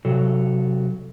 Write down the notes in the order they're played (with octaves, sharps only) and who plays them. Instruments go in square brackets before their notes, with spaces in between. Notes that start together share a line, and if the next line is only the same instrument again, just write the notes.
[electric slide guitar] C3 F#3 A4